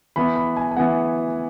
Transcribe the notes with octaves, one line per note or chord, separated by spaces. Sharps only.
E3 B3 B5
B5
G#5
G#5
E3 B3 F#5